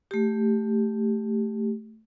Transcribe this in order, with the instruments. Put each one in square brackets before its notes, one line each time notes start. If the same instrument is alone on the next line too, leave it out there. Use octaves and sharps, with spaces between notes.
[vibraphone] A3 G4